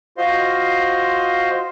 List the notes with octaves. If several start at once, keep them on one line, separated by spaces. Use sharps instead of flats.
F4 F#4 C5 D#5 F5 C6